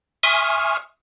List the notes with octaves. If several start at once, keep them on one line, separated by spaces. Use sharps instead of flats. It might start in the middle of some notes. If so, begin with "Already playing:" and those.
E5 G#5 C6 C#6 D#6 F6